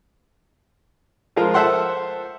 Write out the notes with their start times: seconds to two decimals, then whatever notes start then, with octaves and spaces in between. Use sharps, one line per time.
1.36 F3 G#3 F4 A#4
1.54 A4 C5 E5 F#5 C6